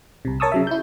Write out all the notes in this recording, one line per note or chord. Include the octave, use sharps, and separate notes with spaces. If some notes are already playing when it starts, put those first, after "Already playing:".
C2 C3
A#4 C#5 A5 C#6 D#6 E6
C#3 F#3 E5
E4 G6